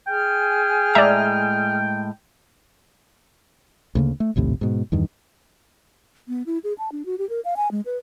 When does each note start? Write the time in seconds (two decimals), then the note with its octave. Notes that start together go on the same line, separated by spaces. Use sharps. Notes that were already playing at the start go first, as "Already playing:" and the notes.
0.07 G#4 G5 G#5 F6
0.95 A2 G#3 D5 E5 A#5
3.95 D2 C#3 A#3
4.20 A3
4.36 A#1 D#2 A2 C3
4.61 G#2 B2
4.92 E2 G2 D#3
6.28 B3
6.46 E4
6.64 G#4
6.78 A5
6.92 D4
7.06 F#4
7.18 G4
7.29 A#4
7.45 F5
7.56 G#5
7.71 G#3
7.86 B4